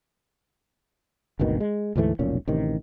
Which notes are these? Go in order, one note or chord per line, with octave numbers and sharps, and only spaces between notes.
G#1 D2 B2 D#3
G#3
D2 G#2 E3 A3
F1 B1 A#2 C#4
A1 C3 D#3